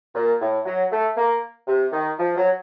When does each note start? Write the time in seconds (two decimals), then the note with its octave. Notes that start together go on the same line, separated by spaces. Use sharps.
0.15 A#2
0.41 A2
0.65 F#3
0.91 A3
1.17 A#3
1.67 C3
1.92 D#3
2.18 F3
2.37 F#3